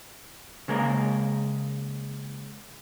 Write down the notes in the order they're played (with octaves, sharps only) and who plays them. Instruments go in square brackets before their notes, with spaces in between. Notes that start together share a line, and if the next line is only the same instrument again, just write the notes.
[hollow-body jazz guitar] C#3 G#3 A#3 A#4